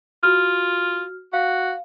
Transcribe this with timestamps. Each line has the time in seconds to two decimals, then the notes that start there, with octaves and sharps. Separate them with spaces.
0.23 F4 F#4 F6
1.33 F#4 F5